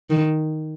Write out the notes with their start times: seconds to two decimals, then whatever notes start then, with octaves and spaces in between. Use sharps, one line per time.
0.10 D#3